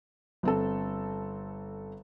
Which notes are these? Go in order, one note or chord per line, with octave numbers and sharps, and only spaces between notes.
G1 C4 A4